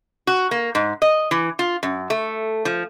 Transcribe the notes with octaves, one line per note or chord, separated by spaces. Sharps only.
F#4
A#3
G#2
D#5
E3
F4
F#2
A3
F3